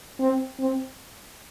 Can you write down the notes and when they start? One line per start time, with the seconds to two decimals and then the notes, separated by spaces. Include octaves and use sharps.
0.20 C4
0.60 C4